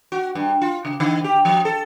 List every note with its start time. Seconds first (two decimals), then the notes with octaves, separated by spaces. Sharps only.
0.12 F#4
0.35 G2
0.62 F4
0.85 C#3
1.00 D3
1.24 G4
1.45 F3
1.65 A4